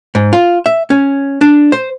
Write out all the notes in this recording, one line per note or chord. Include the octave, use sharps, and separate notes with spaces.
G#2
F4
E5
C#4
D4
C5